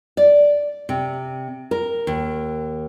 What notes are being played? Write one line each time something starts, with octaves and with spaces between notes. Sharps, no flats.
D5
C3
A#4
D#2